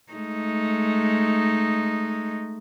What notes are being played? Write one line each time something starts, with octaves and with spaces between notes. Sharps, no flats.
G#3 A3 D#4